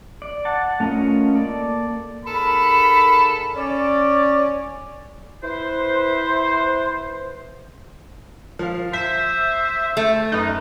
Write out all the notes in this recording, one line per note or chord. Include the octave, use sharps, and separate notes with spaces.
D5
F#5 A5
A3 C#4 F4 A#4 D#5
A#3 A4 D5
G#2 A4 A#4 B5
C#4 D5
E4 B4 C5
F3 F5
C5 E5 B6
A3
F#2 D#4 B4